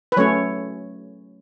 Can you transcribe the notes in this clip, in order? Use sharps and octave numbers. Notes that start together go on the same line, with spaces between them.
B4
F#3 A3 C#4 C#5